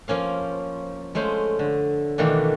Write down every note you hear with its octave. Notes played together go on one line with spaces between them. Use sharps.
F3 A#3 C#4 F5
G#3 A3 C#4 C5 F5
D3
B2 D#3 E3 A3 A#3 D4